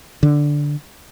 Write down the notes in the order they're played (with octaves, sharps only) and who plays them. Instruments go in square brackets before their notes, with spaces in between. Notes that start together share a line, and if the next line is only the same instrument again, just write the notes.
[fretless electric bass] D3